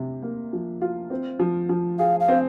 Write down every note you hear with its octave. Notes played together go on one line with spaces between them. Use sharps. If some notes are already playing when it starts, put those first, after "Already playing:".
Already playing: C3
A#3
F3
F4
C4
F3
F3
G#4 F5
F5
C4